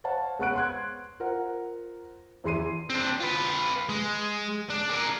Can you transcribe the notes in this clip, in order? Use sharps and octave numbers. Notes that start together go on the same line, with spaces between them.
C5 C#5 F5 F#5 A5
G#3 B3 F#5 C#6 F#6 D7
C6 F#6 G#6
F4 A#4 C5 F#5
E2 E3 G#4 C6 C7 D#7
C4 D4
F4 B4
G#3
D4
G#4 A#4